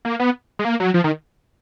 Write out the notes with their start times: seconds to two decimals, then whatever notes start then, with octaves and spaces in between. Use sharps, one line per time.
0.05 A#3
0.20 B3
0.59 G#3
0.65 A#3
0.80 F#3
0.94 F3
1.04 D#3